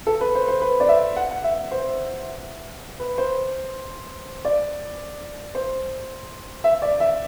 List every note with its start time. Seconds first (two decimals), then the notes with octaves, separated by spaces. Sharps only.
0.07 A4
0.21 B4
0.35 C5
0.48 C5
0.62 B4
0.80 D5
0.89 E5
1.17 F#5
1.31 F#5
1.44 E5
1.71 C5
3.00 B4
3.18 C5
4.45 D5
5.55 C5
6.64 E5
6.82 D5
7.00 E5